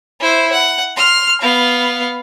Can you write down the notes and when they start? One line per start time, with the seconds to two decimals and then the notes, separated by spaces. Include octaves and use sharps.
0.20 E4 C5
0.52 F#5
0.96 C6 F6
1.41 B3 F5